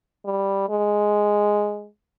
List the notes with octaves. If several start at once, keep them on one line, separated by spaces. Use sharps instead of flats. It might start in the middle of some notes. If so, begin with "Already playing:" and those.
G3
G#3